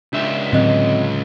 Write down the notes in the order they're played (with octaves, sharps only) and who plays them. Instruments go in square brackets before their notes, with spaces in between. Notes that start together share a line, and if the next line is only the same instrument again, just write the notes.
[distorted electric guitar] C#2 E5 [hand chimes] D4
[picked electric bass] A2 D3 F#3 [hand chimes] C4 D#5 F#6